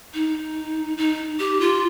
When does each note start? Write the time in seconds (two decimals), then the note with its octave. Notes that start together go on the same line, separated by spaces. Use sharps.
0.14 D#4
0.98 D#4
1.39 G4
1.60 F4